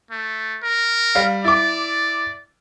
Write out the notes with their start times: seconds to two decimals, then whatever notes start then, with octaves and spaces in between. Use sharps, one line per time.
0.11 A3
0.63 A#4
1.15 G3 F5
1.44 E4 D5 D6